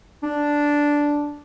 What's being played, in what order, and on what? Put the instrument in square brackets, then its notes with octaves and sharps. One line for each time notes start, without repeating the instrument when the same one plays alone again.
[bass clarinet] D4